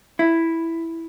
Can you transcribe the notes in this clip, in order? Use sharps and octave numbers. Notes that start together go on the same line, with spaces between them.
E4